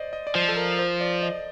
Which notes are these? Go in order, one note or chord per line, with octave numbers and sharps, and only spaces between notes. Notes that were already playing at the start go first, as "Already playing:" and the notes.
Already playing: C5 D5 D#5
D#5
D5
F3 C5
A4
A#4
C5
D5
D#5